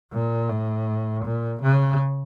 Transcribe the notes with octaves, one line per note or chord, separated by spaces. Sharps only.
A#2
A2
A#2
C#3